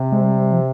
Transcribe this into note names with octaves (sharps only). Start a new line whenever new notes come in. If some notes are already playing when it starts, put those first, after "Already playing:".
Already playing: C3
G#3
G3
F3